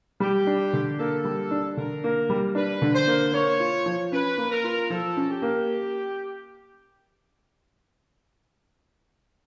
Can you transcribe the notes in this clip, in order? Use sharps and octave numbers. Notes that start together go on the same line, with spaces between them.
G3 G4
D4
D3
A#3 A4
G3
D4
D3 A#4
A#3
G3
D4 B4
D3
C5
A#3
A#3 C#5
F4
F3
C#4 B4
A#3
A#4
F4
F3 A4
C#4
G4
A#3